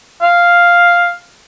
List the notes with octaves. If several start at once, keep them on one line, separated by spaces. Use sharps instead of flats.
F5